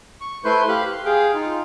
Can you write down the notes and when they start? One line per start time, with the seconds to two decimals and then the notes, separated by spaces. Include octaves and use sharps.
0.21 C#6
0.45 A3 E4 B4 C5 C6 G6
0.68 G4 F5 B5 F#6
0.92 C6
1.05 G#4 F5 G5
1.34 D#4 F4